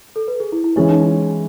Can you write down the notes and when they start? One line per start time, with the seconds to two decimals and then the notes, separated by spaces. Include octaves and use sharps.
0.16 A4
0.28 B4
0.40 G#4
0.52 E4
0.64 E4
0.76 E3 G#3 C#4 E4
0.89 D#4